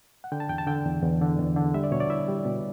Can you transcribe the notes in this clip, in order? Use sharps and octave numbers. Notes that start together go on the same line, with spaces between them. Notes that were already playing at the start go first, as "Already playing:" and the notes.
F#5
D3 G5
A5
E2 G5
A5
D3 G5
E2
E2
D3
E2
D3
G3 E5
D5
B2 C#5
D5
E4 E5
G3
B2